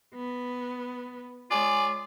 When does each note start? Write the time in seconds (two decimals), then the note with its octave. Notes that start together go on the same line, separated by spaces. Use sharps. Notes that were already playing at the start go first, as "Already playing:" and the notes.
0.15 B3
1.51 G#3 F4 G#4 C#5 D5 G#5